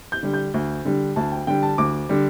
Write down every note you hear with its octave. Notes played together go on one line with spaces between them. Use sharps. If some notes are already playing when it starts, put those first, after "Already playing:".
G6
D3 G3
G6
D2
D3 G3
D2 A5
G5
D3 G3 G5
A5
D2 D6
D3 G3